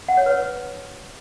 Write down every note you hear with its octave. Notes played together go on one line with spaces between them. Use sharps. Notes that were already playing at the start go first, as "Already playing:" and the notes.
F#5
C#5
B4